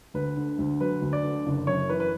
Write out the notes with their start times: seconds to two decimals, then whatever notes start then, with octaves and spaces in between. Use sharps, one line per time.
0.14 D2 B4
0.37 D3
0.59 D2
0.80 F#3 B4
1.02 D2
1.13 D5
1.24 D3
1.46 F#1
1.67 F#2 C#5
1.89 E3 B4
2.00 B4